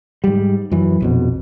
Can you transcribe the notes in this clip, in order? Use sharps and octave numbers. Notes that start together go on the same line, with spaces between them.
G#2 G3
F#2 E3
A#1 F2 B2